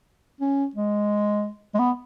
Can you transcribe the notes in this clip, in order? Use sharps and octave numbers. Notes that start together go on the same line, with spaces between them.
C#4
G#3
G#3
B3